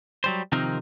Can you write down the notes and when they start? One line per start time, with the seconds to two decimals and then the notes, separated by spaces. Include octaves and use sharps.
0.24 F#3 G3 C5
0.52 C3 D#3 F3 C4 D#4 A#4